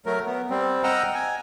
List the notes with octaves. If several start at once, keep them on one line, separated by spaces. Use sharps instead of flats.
F#3 A3 A#4
B3
G3 C4
D#5 F#5 G5 A#5 E6 F6
G#5